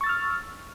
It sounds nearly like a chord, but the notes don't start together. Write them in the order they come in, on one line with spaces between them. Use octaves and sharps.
C#6 A6 E6 F6